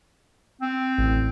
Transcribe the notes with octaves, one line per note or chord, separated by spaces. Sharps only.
C4
A1